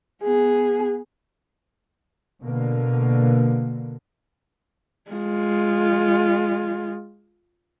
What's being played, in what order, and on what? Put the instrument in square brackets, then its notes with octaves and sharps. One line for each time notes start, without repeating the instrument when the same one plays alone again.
[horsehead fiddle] B3 G#4
[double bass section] B2 D3 A#3
[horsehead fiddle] G#3 F4